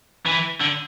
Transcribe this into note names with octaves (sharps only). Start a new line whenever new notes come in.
E3
D3